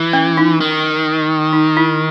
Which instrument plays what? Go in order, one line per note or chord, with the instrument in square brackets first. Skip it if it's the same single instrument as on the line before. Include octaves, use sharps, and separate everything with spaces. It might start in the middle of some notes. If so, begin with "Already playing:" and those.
Already playing: [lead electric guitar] E3
[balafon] C#4
D#4
[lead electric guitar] D#3
[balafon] D#4
E4